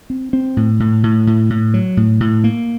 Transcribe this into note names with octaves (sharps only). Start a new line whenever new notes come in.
C4
C4
A2
A2
A2
A2
A2
F#3
A2
A2
A#3